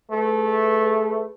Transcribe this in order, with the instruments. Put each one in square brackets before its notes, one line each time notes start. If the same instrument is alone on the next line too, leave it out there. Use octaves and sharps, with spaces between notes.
[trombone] A3 [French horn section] G#4 B4